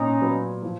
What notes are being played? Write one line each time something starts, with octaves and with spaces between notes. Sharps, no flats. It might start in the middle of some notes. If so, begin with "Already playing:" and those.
Already playing: A#2 C#4 D#4
F#3 B3
F3